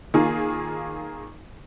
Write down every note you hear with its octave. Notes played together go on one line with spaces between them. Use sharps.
D#3 A#3 F4 G#4